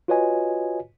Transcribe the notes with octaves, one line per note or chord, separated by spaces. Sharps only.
F4 F#4 B4 C#5 D#5 G#5